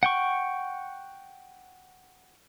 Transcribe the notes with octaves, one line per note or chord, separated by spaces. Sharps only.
F#5 G5 C#6